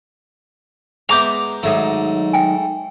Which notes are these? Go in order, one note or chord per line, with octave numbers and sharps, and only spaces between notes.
G#3 B3 D5 E5 A#5 D6 G6
G#2 D#3 F#3 A3 D#4
G5 G#5